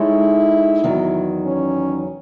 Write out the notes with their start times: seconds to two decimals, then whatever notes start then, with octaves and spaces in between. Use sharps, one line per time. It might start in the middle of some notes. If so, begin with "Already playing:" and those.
Already playing: G#3 D#4 E4 A4 C#5
0.83 E2 D#3 F#3
1.46 C#4